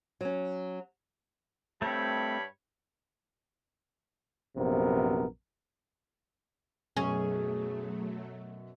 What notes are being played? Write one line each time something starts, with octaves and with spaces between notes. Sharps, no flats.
F#3 C#4
G2 A3 C4 C#5 B5
A#1 F#2 C3 B3 A#4
F#2 B2 F#3 A3 C#4 G#4